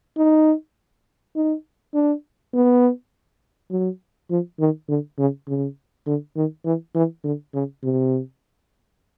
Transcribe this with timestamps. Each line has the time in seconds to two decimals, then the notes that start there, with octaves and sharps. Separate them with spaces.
0.17 D#4
1.36 D#4
1.94 D4
2.54 B3
3.70 F#3
4.30 F3
4.60 D#3
4.88 D3
5.18 C#3
5.48 C#3
6.06 D3
6.36 D#3
6.65 E3
6.95 E3
7.24 D3
7.54 C#3
7.83 C3